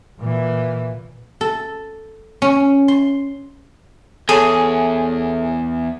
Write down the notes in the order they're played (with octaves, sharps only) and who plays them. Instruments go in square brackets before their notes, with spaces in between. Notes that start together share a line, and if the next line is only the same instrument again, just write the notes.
[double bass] A#2 E3
[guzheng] A4
C#4
C6
[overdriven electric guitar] E2 [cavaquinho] G#4 [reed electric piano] A4 C#5